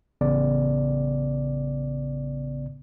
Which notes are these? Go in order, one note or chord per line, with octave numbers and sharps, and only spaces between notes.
A1 C#3 B3 D5